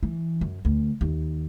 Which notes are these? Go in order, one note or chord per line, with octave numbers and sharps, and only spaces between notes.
E3
F#2
D2
D#2